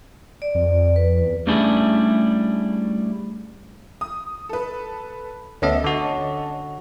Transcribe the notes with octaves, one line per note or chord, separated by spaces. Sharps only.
D5
F2
B4
E2
G3 A3 C#4 D4 E4 G#4
D#6
A4 B4
D2 B3 C#4 A4 D#5 E5
D3 F#4